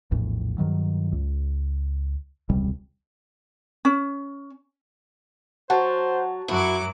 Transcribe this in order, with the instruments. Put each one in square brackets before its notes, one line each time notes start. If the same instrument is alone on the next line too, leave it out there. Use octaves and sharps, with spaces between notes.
[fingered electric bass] A#1 E2 A2
G2 D#3 F#3
C#2
E1 C#2 C3 G3
[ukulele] C#4
[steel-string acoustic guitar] F#3 [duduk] C5 [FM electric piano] F#5 A5
[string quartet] F#2 F#3 D6 [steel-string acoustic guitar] E4 [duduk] F#4